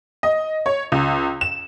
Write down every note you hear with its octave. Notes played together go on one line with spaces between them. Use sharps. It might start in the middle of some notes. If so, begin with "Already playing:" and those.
D#5
C#5
C#2
E7